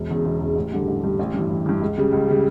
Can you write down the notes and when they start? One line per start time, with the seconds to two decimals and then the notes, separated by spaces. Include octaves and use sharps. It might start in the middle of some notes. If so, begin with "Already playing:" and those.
Already playing: E1
0.08 E2 C#3
0.25 E1
0.41 E2 C#3
0.56 A1
0.72 G2 D3 G3
0.88 A1
1.03 G2 D3 G3
1.19 A1
1.34 G2 E3
1.50 A1
1.66 G2 E3
1.81 C#2
1.97 C#3 G3
2.12 C#2
2.28 C#3 G3